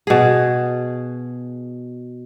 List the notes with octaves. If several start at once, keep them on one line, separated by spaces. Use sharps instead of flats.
B2 G#4